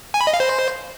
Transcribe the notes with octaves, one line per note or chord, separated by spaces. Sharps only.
G#5
B5
D#5
F5
C5